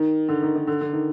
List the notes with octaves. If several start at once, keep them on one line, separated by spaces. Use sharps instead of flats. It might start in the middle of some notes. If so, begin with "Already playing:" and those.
Already playing: D#3
D3
D#3
D#3
D3
D3
D#3